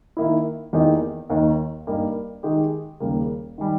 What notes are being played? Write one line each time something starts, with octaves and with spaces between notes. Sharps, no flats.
D#3 A#3 E4
E2 D#3 A#3 D#4 G4
D#2 D#3 A#3 D#4
G2 G3 A#3 D#4
D#3 G#3 D#4 G4
D#2 C#3 G3 A#3
D#3 G3